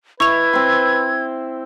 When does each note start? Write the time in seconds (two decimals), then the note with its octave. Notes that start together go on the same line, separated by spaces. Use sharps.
0.20 E4 B4 C#6 G#6 F7
0.53 C4 C6